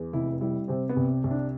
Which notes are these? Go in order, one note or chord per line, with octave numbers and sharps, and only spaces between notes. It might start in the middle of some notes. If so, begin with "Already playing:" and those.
Already playing: E2
F1 E4
G3 E4
C3 C4
B3
C2
C2
D4